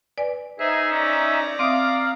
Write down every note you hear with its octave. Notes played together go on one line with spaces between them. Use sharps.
B4 D5 G#5
D#4 G#4 C5 E5
C#4 D5 A#5
C4 E5 F5 D6 D#6